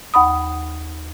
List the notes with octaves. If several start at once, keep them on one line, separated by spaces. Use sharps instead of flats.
D#2 F#5 B5 D#6